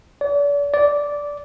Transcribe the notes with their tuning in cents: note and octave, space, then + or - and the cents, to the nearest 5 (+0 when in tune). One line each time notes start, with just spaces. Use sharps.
D5 -40
D5 -10